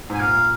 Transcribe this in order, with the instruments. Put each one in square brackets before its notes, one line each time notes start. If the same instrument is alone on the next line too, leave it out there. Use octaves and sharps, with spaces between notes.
[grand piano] G#2 [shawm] G#5
[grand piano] A#2 [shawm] F5